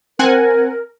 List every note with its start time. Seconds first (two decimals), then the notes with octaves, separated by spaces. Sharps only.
0.19 C4 A#4 F#5 G#5